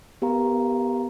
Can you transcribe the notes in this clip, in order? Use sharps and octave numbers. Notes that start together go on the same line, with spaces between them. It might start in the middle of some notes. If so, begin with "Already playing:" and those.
B3 G4 A#4 F5 A#5